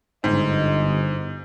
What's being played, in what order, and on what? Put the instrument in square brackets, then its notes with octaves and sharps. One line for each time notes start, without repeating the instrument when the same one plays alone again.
[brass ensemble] G1 D#5 [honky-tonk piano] G#2